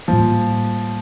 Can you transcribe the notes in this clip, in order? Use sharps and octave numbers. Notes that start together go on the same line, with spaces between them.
A2 F3 G3 A#3